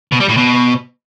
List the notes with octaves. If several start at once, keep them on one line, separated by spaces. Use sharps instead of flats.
B2
G3
A2
B2